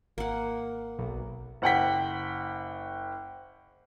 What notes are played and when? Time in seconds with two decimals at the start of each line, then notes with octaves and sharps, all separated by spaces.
0.18 G#1 A#3 F#5
0.98 B1
1.62 F#1 F#5 G5 B6